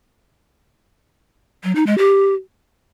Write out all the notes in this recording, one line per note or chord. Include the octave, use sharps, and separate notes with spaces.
F#3
D#4
G#3
G4